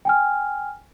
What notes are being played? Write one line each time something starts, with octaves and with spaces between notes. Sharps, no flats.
G5 G#5 F6